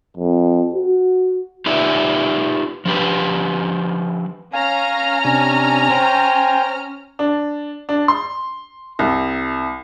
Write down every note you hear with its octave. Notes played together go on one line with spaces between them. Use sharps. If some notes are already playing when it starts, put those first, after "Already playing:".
F2
F#4
D#4 F4 G4 B4 D5 E5
F3 D4 G4 B4
C#4 F5 G#5 A#5 F6
C3 D4 G#5
C5 G5 G#5
D4
D4
C6
C2